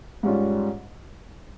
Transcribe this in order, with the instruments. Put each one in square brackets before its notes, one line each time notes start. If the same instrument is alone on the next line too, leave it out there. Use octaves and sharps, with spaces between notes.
[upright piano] G#2 G3 C#4 F4